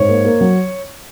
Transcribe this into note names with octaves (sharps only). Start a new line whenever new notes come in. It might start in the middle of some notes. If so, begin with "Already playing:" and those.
Already playing: G#2 C#5
A#3
A#3
F#3